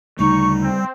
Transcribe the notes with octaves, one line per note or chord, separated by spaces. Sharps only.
D2 C#3 G3 A3 D#4 C#6
C4